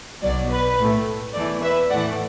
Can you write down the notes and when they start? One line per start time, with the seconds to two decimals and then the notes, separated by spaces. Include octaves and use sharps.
0.23 B1 B2 F#3 D5
0.50 B4
0.79 A2 A3
1.35 E2 E3 A3 D5
1.63 B4 E5
1.91 A2 E3 A3 D5 F#5